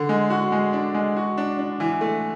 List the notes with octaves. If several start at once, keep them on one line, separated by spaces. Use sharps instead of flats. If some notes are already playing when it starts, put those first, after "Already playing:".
Already playing: D3
G#3
F#4
G#3
D4
G#3
F#4
D4
D4
E3
A3